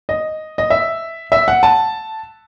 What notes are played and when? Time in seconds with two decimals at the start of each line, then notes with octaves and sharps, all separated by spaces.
0.09 D#5
0.58 D#5
0.70 E5
1.32 E5
1.48 F#5
1.63 A5